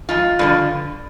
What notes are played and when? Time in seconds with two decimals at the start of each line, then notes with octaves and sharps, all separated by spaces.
0.09 G#2 F3 F4
0.39 G2 D3 F3